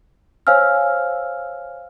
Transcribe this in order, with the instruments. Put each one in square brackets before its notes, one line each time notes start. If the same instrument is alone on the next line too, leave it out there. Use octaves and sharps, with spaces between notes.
[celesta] C5 C#5 F5 G#5 E6 F6